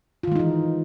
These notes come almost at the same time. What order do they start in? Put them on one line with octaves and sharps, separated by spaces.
F4 D#3 G#3 D#4 E3